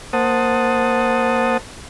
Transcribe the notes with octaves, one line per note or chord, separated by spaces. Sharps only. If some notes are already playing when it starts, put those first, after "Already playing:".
A#3 C5 F#5 A5 D#6